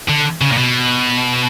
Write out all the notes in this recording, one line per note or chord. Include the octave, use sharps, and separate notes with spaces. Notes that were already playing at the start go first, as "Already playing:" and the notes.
D3
C#3
A#2
B2